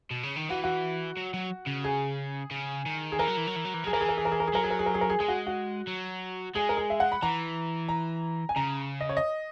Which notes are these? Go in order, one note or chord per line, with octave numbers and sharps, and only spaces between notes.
B2
C#3
D#3
E3 F#4
F#4
F#3
F#3
C#3
G#4
C#3
D#3
G#4
E3 A#4
F#3
E3
F#3
E3
F#3
E3
F#3 G#4
E3 A#4
G#4
A#4
G#4
A#4
G#4
A#4
G#4
F#3 A#4
G#4
A#4
G#4
A#4
G#4
A#4
G#4
G#3 G#4
F#4
F#4
F#3
G#3 G#4
A#4
G#4
E5
F#5
B5
E3 A#5
A#5
G#5
C#3 A#5
D#5
C#5
D#5